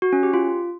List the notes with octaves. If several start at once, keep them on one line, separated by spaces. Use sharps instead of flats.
F#4
C#4
G4
F4